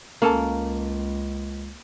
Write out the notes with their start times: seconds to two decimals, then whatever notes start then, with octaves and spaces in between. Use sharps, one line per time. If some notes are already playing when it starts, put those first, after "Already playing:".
0.22 C#2 A#3 C#4 A4 A5